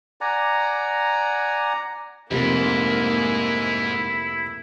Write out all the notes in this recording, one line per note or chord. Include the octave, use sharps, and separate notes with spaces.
D5 F#5 G#5 A#5
F1 G#2 A#3 E4